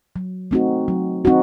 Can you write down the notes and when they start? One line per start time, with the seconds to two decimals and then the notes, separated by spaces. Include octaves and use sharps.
0.16 F#3
0.51 A3 C4 D#4 F#4
0.88 F#3
1.25 C4 D#4 F#4